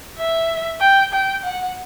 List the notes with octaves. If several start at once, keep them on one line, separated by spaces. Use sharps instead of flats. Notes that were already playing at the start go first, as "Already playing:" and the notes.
E5
G5
G5
F#5